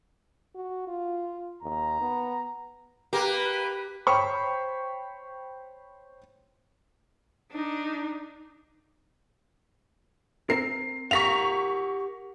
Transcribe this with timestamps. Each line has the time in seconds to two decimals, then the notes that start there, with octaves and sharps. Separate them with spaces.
0.55 F#4
0.88 F4
1.63 D#2 A#5
2.02 B3
3.13 A#3 G4 A#4 B4
4.07 C5 C#5 G5 B5 C#6
7.51 D4 D#4
10.50 C4 A#4 C7
11.11 G4 A#4 F5 F#5 A#5 C#6 B6 F7